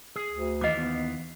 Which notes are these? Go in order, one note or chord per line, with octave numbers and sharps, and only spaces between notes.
G#4
D2
D#2 E3 D#5 F5 D6
B3